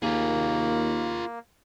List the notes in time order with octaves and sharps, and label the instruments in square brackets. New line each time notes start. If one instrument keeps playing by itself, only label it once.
[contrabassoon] D#2 [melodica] A#3 [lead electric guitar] F4 G#4